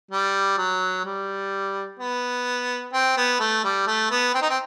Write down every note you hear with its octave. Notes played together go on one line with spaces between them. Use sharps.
G3
F#3
G3
B3
C4
B3
A3
G3
A3
B3
C4
D#4
C4